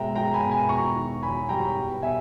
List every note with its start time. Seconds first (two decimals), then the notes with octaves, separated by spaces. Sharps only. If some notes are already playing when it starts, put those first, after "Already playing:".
Already playing: B2 G#3 E5 G5 A#5
0.15 G#3 G5 A#5
0.34 G#5 B5
0.43 B2
0.51 G#5 B5
0.69 E2 A#5 C#6
0.96 D#3
1.22 E2 G#5 B5
1.49 G3 G5 A#5
1.76 E2
2.02 B2 E5 G#5